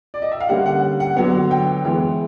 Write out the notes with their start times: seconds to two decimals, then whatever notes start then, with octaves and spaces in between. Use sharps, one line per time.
0.14 D5
0.22 D#5
0.32 E5
0.40 F5
0.49 D3 G3 A#3 C#4 F#5
0.66 F#5
1.00 F#5
1.16 D3 F#3 B3 F#5
1.51 G5
1.67 G5
1.85 E3 G#3 B3